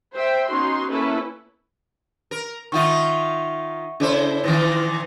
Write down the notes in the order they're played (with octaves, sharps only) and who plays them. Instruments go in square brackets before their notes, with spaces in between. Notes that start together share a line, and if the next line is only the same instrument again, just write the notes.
[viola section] C5 E5 G5
B3 C#4 D#4 F#4 C6
A#3 B3 C#4 E4 A4 B4
[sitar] A#4
[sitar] D#3 D#4 F4 [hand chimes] E5 F#5 C#6
[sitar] C#3 E4 C5 [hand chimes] D4 A4 D5
[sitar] A#2 D#3 E3 [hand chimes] E4 B4 A#6